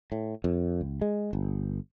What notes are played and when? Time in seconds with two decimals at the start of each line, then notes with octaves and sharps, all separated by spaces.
0.12 A2
0.44 F2
0.81 C#2
1.01 G#3
1.33 G1